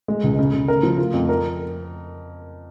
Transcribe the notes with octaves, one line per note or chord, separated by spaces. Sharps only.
G#3
C#2
C#3
C#3
A#4
F3
F4
F2
A#4